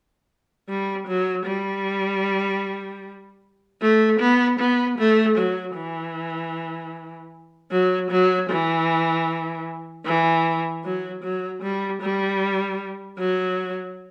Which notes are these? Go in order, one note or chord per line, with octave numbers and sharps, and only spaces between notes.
G3
F#3
G3
A3
B3
B3
A3
F#3
E3
F#3
F#3
E3
E3
F#3
F#3
G3
G3
F#3